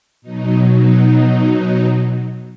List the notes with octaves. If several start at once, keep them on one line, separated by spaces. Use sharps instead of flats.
B2 F#3 D#4
D#4